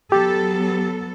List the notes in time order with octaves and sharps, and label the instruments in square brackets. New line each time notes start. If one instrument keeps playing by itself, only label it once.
[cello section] F#3 B3 A4 [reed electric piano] G4